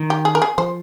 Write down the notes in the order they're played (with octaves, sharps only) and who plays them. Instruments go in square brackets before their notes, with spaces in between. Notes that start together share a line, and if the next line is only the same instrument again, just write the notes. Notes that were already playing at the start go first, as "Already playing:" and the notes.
Already playing: [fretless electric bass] D#3
[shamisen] G4
G#4
A#4
G#4
[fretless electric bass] F3 [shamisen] C5